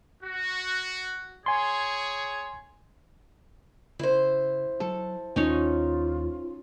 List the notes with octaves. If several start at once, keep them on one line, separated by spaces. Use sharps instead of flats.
F#4
G#4 C#5 G#5 C6
C#3 E4 C5
F#3 A4
D#2 C#4 D#4 F4 C#5